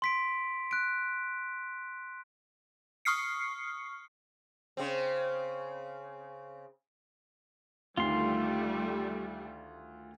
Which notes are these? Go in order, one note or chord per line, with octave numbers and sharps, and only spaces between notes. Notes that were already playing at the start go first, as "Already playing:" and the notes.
C6 B6 D7
F#6 D7
C#6 D#6 F6 C7 C#7
C#3 C4
D2 D#3 G3 A3 F4 C6